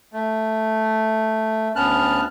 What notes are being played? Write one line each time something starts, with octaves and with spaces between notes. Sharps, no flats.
A3
D2 B3 C#4 A5 F6 F#6